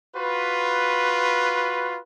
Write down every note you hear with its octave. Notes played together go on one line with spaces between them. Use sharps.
F4 F#4 B4